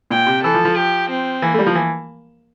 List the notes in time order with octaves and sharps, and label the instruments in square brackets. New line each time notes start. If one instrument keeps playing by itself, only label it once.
[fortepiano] A#2 [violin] G5
[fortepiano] C3
[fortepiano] E3 [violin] A4
[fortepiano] F3
F3
[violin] G4
C4
[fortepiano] E3 [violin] A#3
[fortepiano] A3
G3
F3
E3